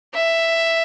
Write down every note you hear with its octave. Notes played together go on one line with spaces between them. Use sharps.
E5